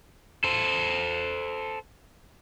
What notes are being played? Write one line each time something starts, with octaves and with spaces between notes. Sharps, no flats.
A4 C5